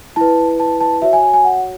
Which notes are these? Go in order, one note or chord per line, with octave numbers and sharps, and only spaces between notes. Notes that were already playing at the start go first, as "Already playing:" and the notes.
E4 B4 A5
A5
A5
F#4 C#5 E5
G#5
G#5
G#5
F#5